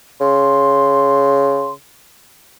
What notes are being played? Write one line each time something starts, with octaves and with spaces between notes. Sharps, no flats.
C#3 C6